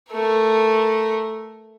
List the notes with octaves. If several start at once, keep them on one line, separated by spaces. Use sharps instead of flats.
A3 A#4